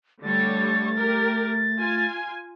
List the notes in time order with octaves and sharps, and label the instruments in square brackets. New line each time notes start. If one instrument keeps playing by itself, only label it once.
[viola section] D3 G3 C#5 [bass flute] A3 [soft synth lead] A6
[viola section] G4 A#4
F4 G#5